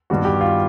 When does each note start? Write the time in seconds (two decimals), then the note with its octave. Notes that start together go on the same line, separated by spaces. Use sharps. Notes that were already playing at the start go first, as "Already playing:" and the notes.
0.10 G2 D#3 G3 B3 F#4
0.25 G4
0.41 F4